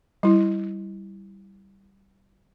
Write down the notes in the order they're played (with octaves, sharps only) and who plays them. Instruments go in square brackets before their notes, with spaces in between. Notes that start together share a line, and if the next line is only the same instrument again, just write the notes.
[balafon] G3 E4